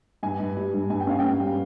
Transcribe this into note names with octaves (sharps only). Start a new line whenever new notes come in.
G2 G#5
G2
G3
G2
G2 G#5
G5
C#4 F5
G5
C#4
G3